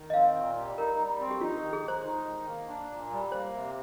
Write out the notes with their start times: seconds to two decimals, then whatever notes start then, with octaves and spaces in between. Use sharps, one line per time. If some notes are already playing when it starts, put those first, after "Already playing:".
Already playing: D#3
0.10 D#5
0.14 C4 F5
0.35 A#2
0.56 G3
0.77 D#4 A#4
0.98 G3
1.19 C4
1.31 G4
1.41 D#4 F4
1.57 D#3 G4
1.73 G#4
1.83 G#3 C5
2.04 D#4
2.26 D#3
2.47 A#3
2.68 D4
2.89 A#2
3.11 G3
3.31 A#3 C5
3.53 C3